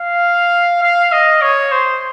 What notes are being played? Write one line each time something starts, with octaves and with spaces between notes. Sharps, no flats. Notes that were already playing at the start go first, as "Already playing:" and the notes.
Already playing: F5
F5
D#5
C#5
C5